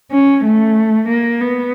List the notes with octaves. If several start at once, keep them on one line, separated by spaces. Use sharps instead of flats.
C#4
A3
A#3
B3